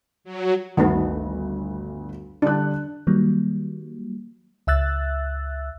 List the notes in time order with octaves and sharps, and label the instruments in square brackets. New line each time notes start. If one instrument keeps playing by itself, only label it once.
[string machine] F#3
[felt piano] G1 D2 F#4 [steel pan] D#3 A3 B3
[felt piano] D3 G3 F#6 [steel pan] D4
[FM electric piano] D#3 F#3 G3 A#3
C#2 E5 E6 F#6 A6